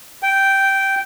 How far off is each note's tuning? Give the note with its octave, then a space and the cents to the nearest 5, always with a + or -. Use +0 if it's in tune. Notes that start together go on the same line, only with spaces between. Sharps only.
G5 -10